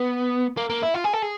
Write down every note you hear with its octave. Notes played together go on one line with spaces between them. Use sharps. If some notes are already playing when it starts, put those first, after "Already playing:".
Already playing: B3
A#3
A#3
E4
F4
G#4
A4
G#4